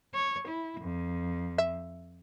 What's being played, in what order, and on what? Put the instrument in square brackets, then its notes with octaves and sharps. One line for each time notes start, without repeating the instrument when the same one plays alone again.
[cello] C#5
E4
F2
[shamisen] E5